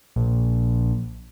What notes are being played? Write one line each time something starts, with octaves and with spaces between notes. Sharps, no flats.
A#1